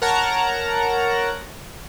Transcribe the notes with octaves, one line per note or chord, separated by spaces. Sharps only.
A#4 C#5 F#5 A5 A#5